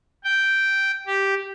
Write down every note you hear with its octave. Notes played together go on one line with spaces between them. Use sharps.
G5
G4